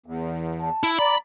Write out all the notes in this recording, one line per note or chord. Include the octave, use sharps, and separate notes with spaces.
E2
A5
E4
D5 A#5 B5